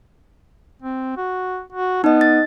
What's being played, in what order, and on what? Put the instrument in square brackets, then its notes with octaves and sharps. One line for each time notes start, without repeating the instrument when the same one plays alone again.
[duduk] C4
F#4
F#4
[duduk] B3 [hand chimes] D#4 D#5
[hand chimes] A6